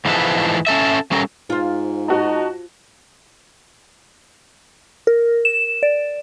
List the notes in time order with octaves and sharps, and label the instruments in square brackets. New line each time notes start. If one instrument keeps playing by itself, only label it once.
[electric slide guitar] G#2 E3 F3 G#3 A4 B4
C#4 A4 E5
G3 C#4 A4 A#4
[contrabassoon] G#2 [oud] F4 C5
[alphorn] D#4 [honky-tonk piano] F#4 A5
[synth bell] A#4
E7
D5